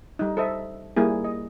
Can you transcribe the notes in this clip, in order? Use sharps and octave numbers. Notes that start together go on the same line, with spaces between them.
G3 D#4
A4 C5 D#5 E5
G3 A#3 E4 G#4
D#5